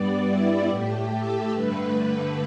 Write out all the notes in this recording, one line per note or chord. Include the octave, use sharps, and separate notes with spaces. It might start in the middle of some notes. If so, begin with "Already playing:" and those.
Already playing: G2 G3 B3 D5
E4
A2 A3 G4
A4
G2 D3 A3 B4